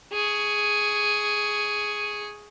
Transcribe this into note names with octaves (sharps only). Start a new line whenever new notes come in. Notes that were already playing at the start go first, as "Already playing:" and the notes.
G#4 C#6